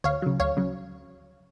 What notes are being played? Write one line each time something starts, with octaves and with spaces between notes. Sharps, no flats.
D2 C#5 F5
C#3 F#3
D2 C#5 F5
C#3 F#3